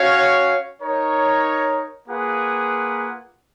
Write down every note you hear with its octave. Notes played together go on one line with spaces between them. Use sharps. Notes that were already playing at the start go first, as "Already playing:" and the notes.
Already playing: C#4 F#4 C#5 F5
D#4 A#4 C#5
A#3 F4 G#4 B4 F#5